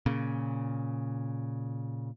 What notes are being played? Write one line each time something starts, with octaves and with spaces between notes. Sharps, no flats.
A#2 C#3